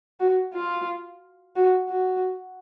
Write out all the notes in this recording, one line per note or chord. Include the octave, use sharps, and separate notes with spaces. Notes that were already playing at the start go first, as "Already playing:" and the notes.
F#4
F4
F#4
F#4